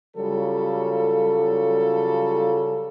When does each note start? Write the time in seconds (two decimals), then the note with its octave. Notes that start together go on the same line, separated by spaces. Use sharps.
0.17 C#3 F#3 G3 F4 A4